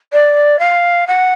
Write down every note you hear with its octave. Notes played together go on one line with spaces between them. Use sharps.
D5
F5
F#5